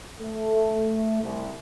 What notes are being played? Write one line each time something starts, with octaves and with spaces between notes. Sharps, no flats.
A3
C2